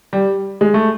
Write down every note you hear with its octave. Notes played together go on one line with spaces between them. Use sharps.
G3
G#3
A3